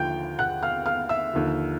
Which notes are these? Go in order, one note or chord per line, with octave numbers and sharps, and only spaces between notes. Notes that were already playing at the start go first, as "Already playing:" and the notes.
Already playing: D#2 D3 F3 G5 G6
F#5 F#6
F5 F6
F5 F6
E5 E6
D#2 D3 F3